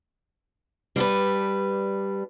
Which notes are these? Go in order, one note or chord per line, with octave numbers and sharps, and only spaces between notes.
G3 D4 B4